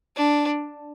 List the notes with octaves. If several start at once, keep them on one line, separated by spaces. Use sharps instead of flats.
D4